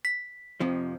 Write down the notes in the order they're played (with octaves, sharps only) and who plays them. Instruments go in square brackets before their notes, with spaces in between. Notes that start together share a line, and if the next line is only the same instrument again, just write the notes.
[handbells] B6
[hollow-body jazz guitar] F2 C3 F3